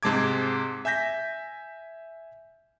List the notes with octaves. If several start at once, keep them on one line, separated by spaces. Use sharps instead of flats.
G#2 C3 G#3 A5 D6 G#6
E5 G#5 G6 A#6 B6